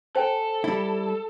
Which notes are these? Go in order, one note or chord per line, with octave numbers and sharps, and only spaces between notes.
A4 C5 G5 G#5
G3 E4